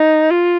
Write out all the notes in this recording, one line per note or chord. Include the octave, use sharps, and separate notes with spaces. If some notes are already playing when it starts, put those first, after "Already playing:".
Already playing: D#4
F4